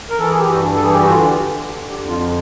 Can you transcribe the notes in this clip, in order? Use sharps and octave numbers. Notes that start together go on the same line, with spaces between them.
A#4
E3 A4
G#4
G4
G2 F#4
A4
E3 G#4
G4
F#4
D3 F4
G4
D3
D3
G4
F2
F4